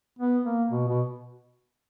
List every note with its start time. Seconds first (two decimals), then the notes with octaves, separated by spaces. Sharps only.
0.19 B3
0.45 A#3
0.71 B2
0.88 B2